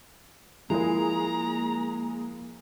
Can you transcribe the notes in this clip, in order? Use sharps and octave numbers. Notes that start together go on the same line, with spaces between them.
F3 G#3 A#3 E4 G#4 A#4 A#5